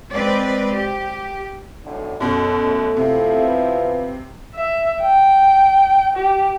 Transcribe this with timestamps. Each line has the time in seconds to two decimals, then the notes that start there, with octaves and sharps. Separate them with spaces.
0.12 G#3 C4 B4 D5
0.72 G4
1.84 B1 A2 D3
2.20 F#2 B2 A4
2.63 A3
2.97 C3 F3 B3 E4
3.45 B4
4.55 E5
5.02 G5
6.15 G4